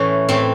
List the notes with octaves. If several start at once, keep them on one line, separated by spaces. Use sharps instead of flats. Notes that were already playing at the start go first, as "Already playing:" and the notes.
Already playing: A2 E3 C#4
A2 E3 C4